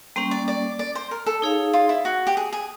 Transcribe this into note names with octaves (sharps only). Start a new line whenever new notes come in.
G3 A#3 C#4 C5
D5
D5
D5
C5
A#4
A4
D#4 G#4 C#5 F5
F4
E4
F#4
G4
G#4
G#4